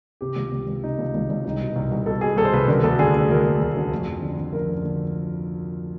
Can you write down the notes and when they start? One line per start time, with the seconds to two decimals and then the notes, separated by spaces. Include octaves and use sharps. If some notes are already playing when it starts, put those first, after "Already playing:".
0.21 C3 G4
0.36 C#2
0.52 C#2
0.67 C#2
0.83 C3 D#4
0.98 C#2
1.14 C#2
1.30 C#2
1.45 C2 D#4
1.61 B2
1.76 C2
1.91 C2
2.06 B2 A4
2.21 B2 G#4
2.37 C2 A4
2.45 C5
2.53 C2 B4
2.68 D3 A#4
2.83 D2 A4
2.99 D3 G#4
3.15 D3
3.29 D2 A#4
3.45 D2
3.61 D2
3.77 D3
3.91 F2
4.06 F2
4.22 D3
4.38 D3
4.53 F2 A#4
4.69 D3
4.85 D3